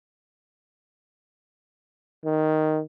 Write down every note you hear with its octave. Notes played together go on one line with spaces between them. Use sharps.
D#3